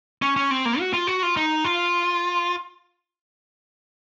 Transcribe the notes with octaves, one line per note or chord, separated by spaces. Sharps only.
C#4
C#4
C4
A#3
F#4
F4
F#4
F4
D#4
F4